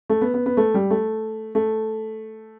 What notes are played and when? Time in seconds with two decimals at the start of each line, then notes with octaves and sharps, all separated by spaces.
0.09 A3
0.21 B3
0.34 B3
0.46 B3
0.57 A3
0.74 G3
0.90 A3
1.55 A3